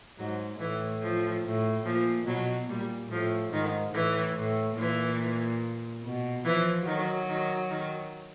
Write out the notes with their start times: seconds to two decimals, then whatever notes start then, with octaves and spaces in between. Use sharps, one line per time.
0.19 G#2 F#3
0.60 A2 E3
1.02 F3
1.44 A2
1.85 A#2 F3
2.27 B2 F#3
2.69 A#2 G3
3.11 A2 F3
3.53 G#2 D#3
3.94 A2 E3
4.36 A2
4.78 A#2 E3
6.03 B2
6.45 E3 F3
6.86 D#3 F#3
7.29 D#3
7.70 D#3